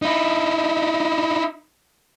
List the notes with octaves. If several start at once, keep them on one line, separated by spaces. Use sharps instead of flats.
D#4 E4